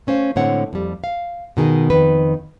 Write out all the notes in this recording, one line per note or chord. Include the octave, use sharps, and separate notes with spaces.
A3 C#4 C5 F5
A2 D3 G#3 C4 C#5 F#5
F2 G3
F5
B2 D#3 G#4
F2 D#3 B4